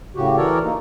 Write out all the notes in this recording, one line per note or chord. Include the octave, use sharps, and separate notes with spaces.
A2 C#3 F#4 G4
E3 F#4 A4 A#4 C#5 D5
A#3 D#4